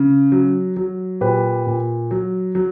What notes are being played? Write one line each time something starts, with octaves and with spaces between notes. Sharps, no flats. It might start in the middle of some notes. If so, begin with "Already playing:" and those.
Already playing: C#3
F#3
F#3
A#2 G4 B4
A#2
F#3
F#3